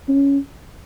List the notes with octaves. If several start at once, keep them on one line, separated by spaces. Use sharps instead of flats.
C#4